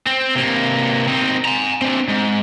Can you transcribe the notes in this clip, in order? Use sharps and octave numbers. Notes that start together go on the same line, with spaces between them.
C4
C3 A#3
C4 D#4
G#5 A#5
C4 D4
G#2